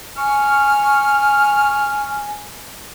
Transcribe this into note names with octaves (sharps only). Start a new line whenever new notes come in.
G#5 C#6 F6